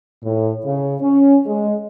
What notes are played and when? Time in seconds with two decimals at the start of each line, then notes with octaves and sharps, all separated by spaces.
0.24 A2
0.66 C#3
1.01 C#4
1.46 G#3